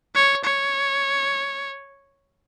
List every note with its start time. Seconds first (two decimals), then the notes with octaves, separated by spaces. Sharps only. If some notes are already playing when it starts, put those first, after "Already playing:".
0.15 C#5
0.44 C#5